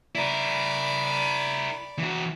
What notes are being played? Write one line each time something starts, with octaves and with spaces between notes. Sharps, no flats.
E4 A#4 D5 B5
E3 F#4